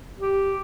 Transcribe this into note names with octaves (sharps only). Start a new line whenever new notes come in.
G4